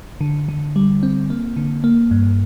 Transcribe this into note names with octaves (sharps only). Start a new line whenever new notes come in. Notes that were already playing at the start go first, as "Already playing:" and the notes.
D3
D3
G3
C4
A#3
D3
A#3
G2